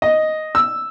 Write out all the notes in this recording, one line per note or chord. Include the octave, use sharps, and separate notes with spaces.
D#5
E6